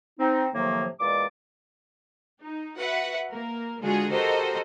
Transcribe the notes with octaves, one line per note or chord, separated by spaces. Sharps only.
C4 D#4
A2 C3 D#3 F3 F#3 A#3
E2 A#2 G#3 D5 D6
D#4
F#4 B4 E5 F#5
A#3 A#4
D3 G#3 F4 F#4 G#4
F#4 G4 A4 A#4 C5 D#5